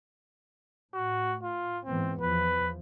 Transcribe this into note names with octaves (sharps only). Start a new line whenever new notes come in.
A2 F#4
F4
G#2 E3 B3 C4
E2 F3 B4